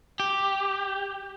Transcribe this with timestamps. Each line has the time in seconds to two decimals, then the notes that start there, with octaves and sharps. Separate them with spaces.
0.20 G4